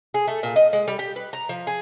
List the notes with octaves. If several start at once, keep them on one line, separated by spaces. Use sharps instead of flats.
G#4
A3
A#2
D#5
G#3
G3
G4
B4
A#5
F3
G#4